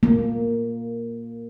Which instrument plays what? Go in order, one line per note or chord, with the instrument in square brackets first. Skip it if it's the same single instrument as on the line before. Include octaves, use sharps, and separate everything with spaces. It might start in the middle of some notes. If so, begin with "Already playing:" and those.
[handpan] A#3